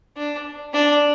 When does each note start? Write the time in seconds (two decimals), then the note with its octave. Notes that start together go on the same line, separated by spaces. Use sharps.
0.17 D4
0.73 D4